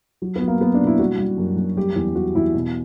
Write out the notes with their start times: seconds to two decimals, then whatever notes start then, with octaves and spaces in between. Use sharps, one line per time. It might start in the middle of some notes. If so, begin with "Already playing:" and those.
0.22 F#3
0.36 B3
0.42 F#3
0.48 A#3
0.61 F#3 B3
0.74 D4
0.81 B2
0.87 E4
0.99 G3 F#4
1.18 G3
1.38 F#2
1.57 F#2
1.77 G3 G4
1.96 E2
2.15 G3 F#4
2.35 E2 E4
2.54 B2